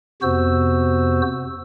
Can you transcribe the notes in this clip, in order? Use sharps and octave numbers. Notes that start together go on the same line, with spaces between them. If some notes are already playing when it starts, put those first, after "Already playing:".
F2 C3 B3 F#4 C5 E6